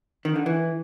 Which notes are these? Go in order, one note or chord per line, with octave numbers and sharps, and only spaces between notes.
D#3
D3
E3